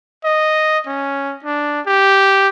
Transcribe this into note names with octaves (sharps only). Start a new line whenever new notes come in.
D#5
C#4
D4
G4